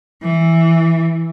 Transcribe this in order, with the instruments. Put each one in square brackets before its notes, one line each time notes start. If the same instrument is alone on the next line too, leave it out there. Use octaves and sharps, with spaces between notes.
[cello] E3